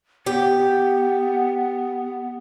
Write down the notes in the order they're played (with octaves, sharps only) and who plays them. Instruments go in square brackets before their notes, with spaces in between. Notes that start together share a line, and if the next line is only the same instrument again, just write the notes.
[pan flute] B3 [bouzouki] G4